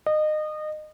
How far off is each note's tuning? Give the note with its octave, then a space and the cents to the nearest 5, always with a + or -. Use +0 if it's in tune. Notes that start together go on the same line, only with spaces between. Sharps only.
D#5 -25